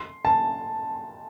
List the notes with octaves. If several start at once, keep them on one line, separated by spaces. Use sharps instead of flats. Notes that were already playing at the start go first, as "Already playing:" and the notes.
Already playing: C6
A5